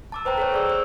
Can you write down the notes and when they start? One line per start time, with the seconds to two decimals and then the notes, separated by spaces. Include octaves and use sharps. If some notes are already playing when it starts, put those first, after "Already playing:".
0.12 A5 D6 E6
0.25 B4 C5 G5 A#5
0.37 A4 C5 C#5
0.52 G#4 D5 E6
0.67 C5 E6